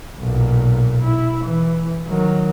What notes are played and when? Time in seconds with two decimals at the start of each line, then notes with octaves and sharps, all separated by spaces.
0.20 B1 A#2
1.04 E4
1.45 E3
2.08 D#3 F#3